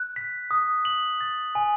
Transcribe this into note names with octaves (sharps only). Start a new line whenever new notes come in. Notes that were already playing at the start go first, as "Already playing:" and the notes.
Already playing: F#6
B6
D#6
F#7
A6
G#5